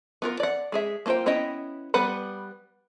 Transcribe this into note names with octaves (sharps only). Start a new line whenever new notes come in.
B3 F4 A#4
D5 F#5
G#3 G#4 E5
A#3 C#4 F4 C5 G5
B3 C#4 E4 D#5 G5
G3 B3 B4 F#5 B5